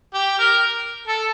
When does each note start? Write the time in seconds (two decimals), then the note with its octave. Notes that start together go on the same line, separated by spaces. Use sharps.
0.14 G4
0.39 A#4
1.08 A4